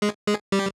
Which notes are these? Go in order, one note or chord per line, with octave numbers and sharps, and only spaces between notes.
G#3 G#4
G#3 G#4
G3 G4